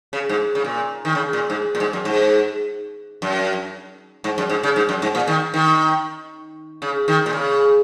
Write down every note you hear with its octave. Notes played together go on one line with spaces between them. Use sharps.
C#3
G#2
C#3
A#2
D#3
C#3
A#2
G#2
A#2
G#2
F#2
G#2
F#2
G#2
F#2
G#2
C#3
G#2
F#2
G#2
A#2
D#3
D#3
C#3
D#3
A#2
C#3